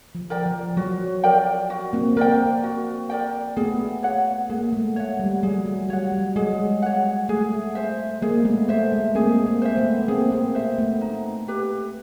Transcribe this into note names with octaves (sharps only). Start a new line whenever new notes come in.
F3
A#4 D5 G5
F3
F#3 F#4
A#4 D5 G5
F#4
A#3 C4
A#3 C4 A#4 D5 G5
F#4
A#4 D5 G5
A3 B3 G#4
C#5 F#5
G#3 A#3 G#4
A3
C#5 F#5
G3
F#3 G#4
F#3
G3 C#5 F#5
F#3
G#3 G#4
C#5 F#5
A3 G#4
C5 E5
G#3 A#3 G#4
A3 B3
A3 C5 E5
G#3
A#3 C4 G#4
A#3 C4
C5 E5
A3 B3
A#3 C4 G#4
A#3 C4
C5 E5
A3 B3
D#4
G4 B4